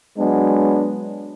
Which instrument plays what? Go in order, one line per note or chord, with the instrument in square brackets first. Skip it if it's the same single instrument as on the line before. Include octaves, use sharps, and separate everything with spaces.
[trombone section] F#3 G#3 B3 D4